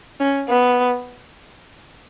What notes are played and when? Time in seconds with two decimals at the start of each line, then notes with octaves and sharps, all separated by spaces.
0.20 C#4
0.49 B3